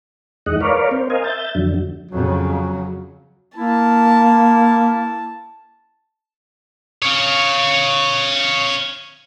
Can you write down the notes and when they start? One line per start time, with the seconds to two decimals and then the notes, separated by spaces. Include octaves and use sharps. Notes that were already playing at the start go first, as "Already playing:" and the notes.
0.46 E2 G#3 D#4 D#5 F#5
0.61 A#4 B4 C#5 D5 F5
0.91 C4 C5
1.10 A#4 C5 D#5 F5 G#5
1.24 E5 G6 A6
1.55 F2 D3 F#3
2.12 F2 C#3 F#3
3.57 A#3 E4 A5
7.02 C#5 F5